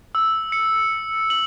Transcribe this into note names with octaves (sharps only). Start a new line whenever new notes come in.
E6
C#7
F#7